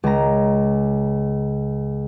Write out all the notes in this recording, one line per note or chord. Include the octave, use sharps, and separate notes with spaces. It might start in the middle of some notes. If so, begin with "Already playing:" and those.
C#2 A#5